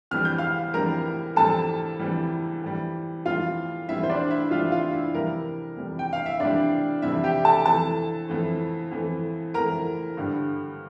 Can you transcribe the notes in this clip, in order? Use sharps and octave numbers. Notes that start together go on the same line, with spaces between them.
F2 E3 G3 F6
G6
F5 F6
F2 E3 G3 A#4 A#5
F2 E3 G3 A4 A5
F2 E3 G3
F2 E3 G3
F2 E3 G3 F4 F5
F2 E3 G3 E4 E5
C5
D4 D5
E4 E5
F2 E3 G3 F4 F5
F4 F5
E4 E5
F2 C3 E3 G3 A#4
F2 C3 E3 G3
G5
F5
E5
F2 C3 E3 G3 D4 D5
F2 C3 E3 G3 E4 E5
G4 G5
A4 A5
F2 E3 A3 A4 A5
F2 E3 A3
F2 E3 A3
F2 E3 A3 A#4 A#5
G2 D3 G3